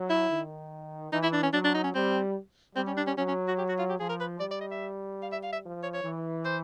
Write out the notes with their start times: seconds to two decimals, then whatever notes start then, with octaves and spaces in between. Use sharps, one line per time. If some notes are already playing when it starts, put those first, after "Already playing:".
Already playing: F#3
0.09 E4
0.30 D#3
1.12 E3 D#4
1.22 E4
1.33 D4
1.43 C#4
1.53 F#3 D4
1.64 D4
1.74 D#4
1.84 C#4
1.95 G3 C4
2.76 G3 C4
2.87 C#4
2.97 D4
3.07 C#4
3.17 F#3 C#4
3.28 C#4
3.47 F#4
3.58 G4
3.68 F#4
3.78 F4
3.89 G4
3.99 F3 G#4
4.09 A#4
4.20 B4
4.40 G3 D5
4.51 D5
4.60 D#5
4.71 E5
5.22 F5
5.32 E5
5.43 F5
5.52 E5
5.63 F3
5.83 C#5
5.94 C#5
6.04 E3
6.45 C5